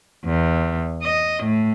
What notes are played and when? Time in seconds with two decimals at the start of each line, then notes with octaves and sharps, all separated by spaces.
0.24 E2
1.02 D#5
1.44 A2